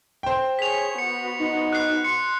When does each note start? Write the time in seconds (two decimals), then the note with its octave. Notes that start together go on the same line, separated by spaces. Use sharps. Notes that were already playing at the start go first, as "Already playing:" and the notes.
0.23 C5 G5
0.59 G#4 C#5 B6 F7
0.98 B3 F#4 C#7
1.39 D#4
1.73 F#6 C7
2.04 C6 C#7